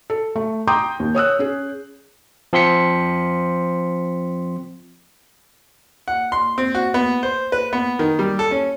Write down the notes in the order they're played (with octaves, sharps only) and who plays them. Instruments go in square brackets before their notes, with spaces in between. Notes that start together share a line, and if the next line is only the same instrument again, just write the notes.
[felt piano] A4
A3
G5 A#5 C6 D6 D#6 G6
D#2
C#5 D#6 E6 F#6
C#4 G#4
[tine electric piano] F3 C4 C6 B6 C#7
[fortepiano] F#5
C6
C4
F#4
B3
C5
B4
B3
D#3
G3
A4
C#4